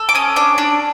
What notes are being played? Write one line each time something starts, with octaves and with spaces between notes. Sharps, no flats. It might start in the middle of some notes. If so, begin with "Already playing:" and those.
Already playing: A4
D6
C#4 D#6
D4 D6
D4